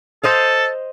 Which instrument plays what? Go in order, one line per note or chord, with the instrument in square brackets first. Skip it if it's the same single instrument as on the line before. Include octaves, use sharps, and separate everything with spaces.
[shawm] A4 [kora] C5 D#5 F5